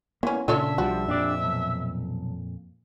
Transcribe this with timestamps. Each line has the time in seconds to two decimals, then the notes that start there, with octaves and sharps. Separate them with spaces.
0.23 E3 A#3 B3 C#4
0.48 A#2 C#3 D4 F4 A4 C#5 E5
0.78 B1 F3 G3 F#4
1.08 F2 A#2 D4 G4 D5
1.43 B1